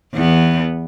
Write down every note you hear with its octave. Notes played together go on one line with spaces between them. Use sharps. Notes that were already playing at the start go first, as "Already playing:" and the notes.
E2 B3